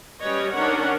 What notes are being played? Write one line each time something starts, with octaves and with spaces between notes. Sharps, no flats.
G3 C#4 B4 C#5 D#5
D#3 C#4 D4 A#4 C#5 F#5